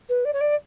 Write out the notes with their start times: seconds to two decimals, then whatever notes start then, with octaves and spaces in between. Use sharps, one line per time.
0.09 B4
0.25 D5
0.33 C#5
0.40 D5